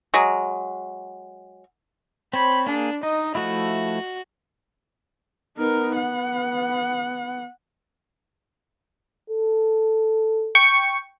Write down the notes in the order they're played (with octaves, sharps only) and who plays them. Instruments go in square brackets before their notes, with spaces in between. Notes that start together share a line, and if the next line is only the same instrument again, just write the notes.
[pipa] F#3 G#3
[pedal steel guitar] C4 C5 C#5 [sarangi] B5
[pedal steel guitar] A#3 G#4 [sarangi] D4
[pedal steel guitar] D#4 [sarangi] D#5
[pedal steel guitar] F3 A3 E4 [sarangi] F#4
[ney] B3 [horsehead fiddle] D#4 A#4
[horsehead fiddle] F#5
[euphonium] A4
[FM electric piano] G5 C#6